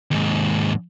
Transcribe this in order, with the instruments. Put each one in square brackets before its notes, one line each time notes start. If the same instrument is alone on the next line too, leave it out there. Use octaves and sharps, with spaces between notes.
[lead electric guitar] D#2 G#2